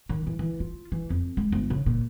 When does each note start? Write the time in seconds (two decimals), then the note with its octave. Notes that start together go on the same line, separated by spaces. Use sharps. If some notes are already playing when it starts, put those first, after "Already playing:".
0.09 D#3
0.27 E3
0.39 E3
0.60 F4
0.92 E3
1.10 F2
1.37 G#3
1.52 G1
1.70 C#3
1.86 A#2